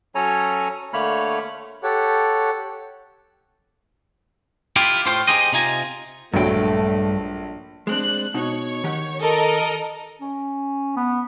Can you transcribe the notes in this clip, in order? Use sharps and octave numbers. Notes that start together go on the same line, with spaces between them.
F#3 C#4 A4 C#5 G#5 A#5
D3 A3 A#3 C#5 B5 F6
G4 A4 C#5 F#5
E4 F4 G4
A2 F4 C5 F5 G5 C6
D#4 G4 G#4 C5 D#5
C3 D#4 F4 G#5 A#5
A#1 G2 F#3 A3 G5
G#3 C4 D4 F#6
B2 D#4 C#5
D#3 G4 F#5
A4 A#4 D#5
C#4
B3